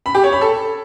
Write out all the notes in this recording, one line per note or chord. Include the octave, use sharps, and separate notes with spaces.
B5
G4
C#5
B5
A4